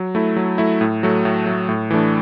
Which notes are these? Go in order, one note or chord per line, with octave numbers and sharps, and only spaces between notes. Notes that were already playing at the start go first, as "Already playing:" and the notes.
Already playing: F#3
A3 E4
F#3
A3 E4
A2
F#3 A3
A2
F#3 A3
A2
E3 A3 D4